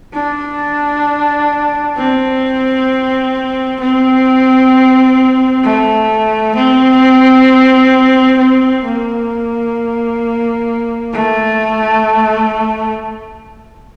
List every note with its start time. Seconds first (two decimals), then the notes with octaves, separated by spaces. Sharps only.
0.13 D4
1.97 C4
3.80 C4
5.64 A3
6.56 C4
8.39 C4
8.85 A#3
11.13 A3